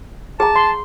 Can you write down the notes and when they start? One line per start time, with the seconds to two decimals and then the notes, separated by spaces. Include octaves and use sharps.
0.40 G#4 A5 A#5
0.56 C6